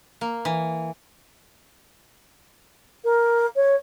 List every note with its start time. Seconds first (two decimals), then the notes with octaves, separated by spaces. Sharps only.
0.21 A#3
0.45 E3
3.04 A#4
3.56 C#5